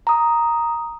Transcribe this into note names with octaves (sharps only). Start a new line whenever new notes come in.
A#5 D#6